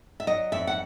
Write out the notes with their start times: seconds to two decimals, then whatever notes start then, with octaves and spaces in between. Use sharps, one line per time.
0.20 E5
0.27 F#3 D#5
0.52 F2 E5
0.67 F#5